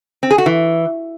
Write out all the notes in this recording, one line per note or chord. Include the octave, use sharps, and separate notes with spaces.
C4
G#4
F#4
E3